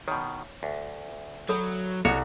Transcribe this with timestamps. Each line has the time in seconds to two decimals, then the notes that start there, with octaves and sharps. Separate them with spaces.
0.08 B2 D#3 C#5
0.63 D2
1.49 F#3 A4 C#5 B5
2.05 C2 F#4 A4 C#5